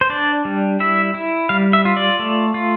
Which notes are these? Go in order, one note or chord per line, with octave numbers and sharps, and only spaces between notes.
C5
D4 D5
G3
E4 E5
E4
G3 F5
E5
F4
D5
A3
F4